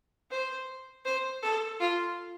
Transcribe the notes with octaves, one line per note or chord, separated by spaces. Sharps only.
C5
C5
A4
F4